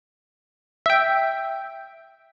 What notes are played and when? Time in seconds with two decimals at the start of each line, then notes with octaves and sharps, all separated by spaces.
0.86 E5 G5